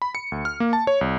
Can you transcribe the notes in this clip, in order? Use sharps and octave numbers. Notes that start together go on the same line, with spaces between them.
B5
C#7
D2
F6
A#3
A5
C#5
C2